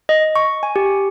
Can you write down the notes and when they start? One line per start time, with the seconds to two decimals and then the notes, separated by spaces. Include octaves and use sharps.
0.09 D#5
0.36 C#6
0.63 G#5
0.76 G4